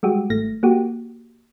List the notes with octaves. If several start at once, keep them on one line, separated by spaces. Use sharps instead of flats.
G3 G#3 F#4 G4
G#1 A3 A#6
A#3 F#4 G4